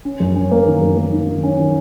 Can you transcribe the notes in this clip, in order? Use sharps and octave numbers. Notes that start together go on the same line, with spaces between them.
C#4
F#2
C#4
A#3
D#3
F#2
A#3
D#3
D#3
C#4
D#3